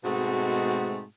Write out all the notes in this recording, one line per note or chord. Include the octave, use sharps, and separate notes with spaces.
G#2 B2 G#3 A3 C4 F#4